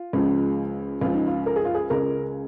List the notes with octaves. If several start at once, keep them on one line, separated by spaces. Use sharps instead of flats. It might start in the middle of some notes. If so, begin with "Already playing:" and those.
Already playing: F4
C#2 C#3 F3 G#3
C#2 C#3 F3 F4
D#4
F4
A#4
G#4
F4
G#4
C#2 C#3 G#3 A#4